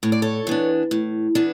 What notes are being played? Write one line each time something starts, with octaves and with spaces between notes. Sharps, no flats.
A2 C#5
D5
A4 C#5
E3 B3 D4
A2
E3 B3 D4